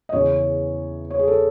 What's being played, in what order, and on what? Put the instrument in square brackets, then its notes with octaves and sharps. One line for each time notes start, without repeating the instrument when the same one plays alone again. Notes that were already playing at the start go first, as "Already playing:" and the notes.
[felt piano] D#5
E2 C#3 E3 C#5
C#5
G#4
A4